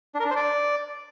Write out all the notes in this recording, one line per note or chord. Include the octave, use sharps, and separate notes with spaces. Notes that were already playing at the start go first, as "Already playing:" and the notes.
D4
A#4
D4
C5
D5